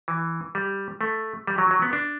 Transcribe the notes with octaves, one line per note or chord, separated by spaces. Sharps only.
E3
G3
A3
G3
F#3
F#3
B3
D4